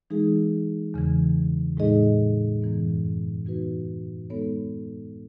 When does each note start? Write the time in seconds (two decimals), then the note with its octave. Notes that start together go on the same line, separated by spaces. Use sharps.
0.10 E3 G#3 D#4 G#4
0.94 E2 C#3 E3
1.77 A2 G#3 D#4 G#4 D#5
2.62 F#2 E3 B3
3.46 E3 B3 D#4 F#4 B4
4.30 G#3 B3 D#4 A4 C#5